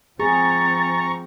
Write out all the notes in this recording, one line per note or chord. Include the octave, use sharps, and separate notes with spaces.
F3 C4 G#4 A#5 C#6 A6